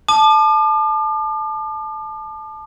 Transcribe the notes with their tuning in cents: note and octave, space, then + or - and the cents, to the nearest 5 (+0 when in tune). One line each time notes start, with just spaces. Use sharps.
A5 -15 D6 +40